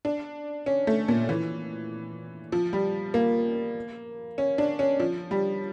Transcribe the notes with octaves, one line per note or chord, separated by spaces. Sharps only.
D4
C#4
A3
A#2
E3
F3
G3
A#3
C#4
D4
C#4
F3
G3